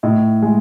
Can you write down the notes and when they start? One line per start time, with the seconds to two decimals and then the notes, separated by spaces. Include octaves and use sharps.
0.03 A2 D#5
0.42 G#3